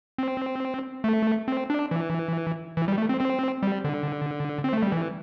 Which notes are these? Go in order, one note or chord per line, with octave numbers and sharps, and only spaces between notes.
C4
A3
C4
D4
E3
E3
G3
A3
C4
C4
G3
D3
C4
A3
G3
E3